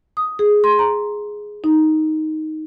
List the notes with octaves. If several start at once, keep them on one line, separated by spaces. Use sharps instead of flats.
D#6
G#4
C6
A#5
D#4